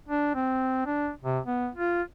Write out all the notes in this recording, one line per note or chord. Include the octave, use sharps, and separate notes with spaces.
D4
C4
D4
C3
B3
F4